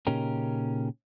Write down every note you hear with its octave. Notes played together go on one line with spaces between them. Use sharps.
A#2 C#3 C#4 D#4 G4 A#4